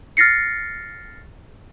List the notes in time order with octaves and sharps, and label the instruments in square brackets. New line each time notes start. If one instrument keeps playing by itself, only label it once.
[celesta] F6 A6 A#6 C7 C#7